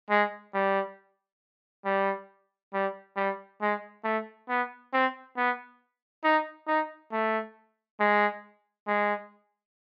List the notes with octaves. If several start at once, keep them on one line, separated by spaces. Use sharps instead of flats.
G#3
G3
G3
G3
G3
G#3
A3
B3
C4
B3
D#4
D#4
A3
G#3
G#3